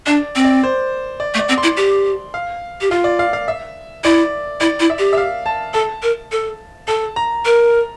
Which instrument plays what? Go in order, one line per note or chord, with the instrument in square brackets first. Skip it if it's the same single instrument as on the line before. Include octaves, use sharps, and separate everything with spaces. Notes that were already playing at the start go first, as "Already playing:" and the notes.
[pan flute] D4 [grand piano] D5
[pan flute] C4
[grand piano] D5
C5
D5
[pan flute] A3
[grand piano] D5
[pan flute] C4
[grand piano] C6
[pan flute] E4
G4
[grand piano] F5
[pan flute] G4
[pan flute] F4 [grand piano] F5
[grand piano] D5
F5
F5
E5
[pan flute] E4 [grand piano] D5
[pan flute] E4 [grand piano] D5
[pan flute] E4
[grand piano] E5
[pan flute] G4
[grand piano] E5
F5
A5
[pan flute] A4 [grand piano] A5
[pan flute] A#4
A4
[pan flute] A4 [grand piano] A5
[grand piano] A#5
[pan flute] A#4